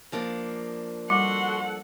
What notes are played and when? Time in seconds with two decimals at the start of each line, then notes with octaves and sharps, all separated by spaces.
0.12 F3 A#3 D4
1.10 G3 F#4 A4 F#5 C6